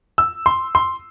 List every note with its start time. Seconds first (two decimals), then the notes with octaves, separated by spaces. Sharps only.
0.18 E6
0.46 C6
0.75 C6